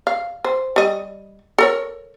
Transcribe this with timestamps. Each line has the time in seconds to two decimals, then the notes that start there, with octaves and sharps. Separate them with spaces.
0.07 F5
0.45 C5
0.76 G3 D#5
1.58 A4 A#4 C#5